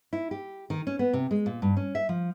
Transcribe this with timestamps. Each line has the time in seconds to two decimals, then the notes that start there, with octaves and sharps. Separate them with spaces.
0.13 E4
0.31 G4
0.70 D#3
0.87 C#4
0.99 B3
1.13 C3
1.31 G#3
1.46 A#2
1.62 G2
1.77 C#4
1.95 E5
2.09 F3